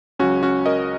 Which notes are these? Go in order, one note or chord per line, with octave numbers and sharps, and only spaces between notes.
C#2 C#3 F#3 C#4 F#4
C#4 F#4
A#4 D#5